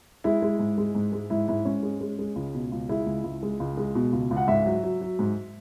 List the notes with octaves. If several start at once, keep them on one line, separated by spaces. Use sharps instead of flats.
G#3 E4
G#3
G#2
G#3
G#2
G#3
G#2 E4
G#2 E4
G#2 C#4
G#3
G#3
G#3
C#2
B2
C#2
G#3 E4
C#2
C#2
G#3
C#2
G#3
B2
C#2
C#2
F#5
G#2 E5
F#3
F#3
F#3
G#2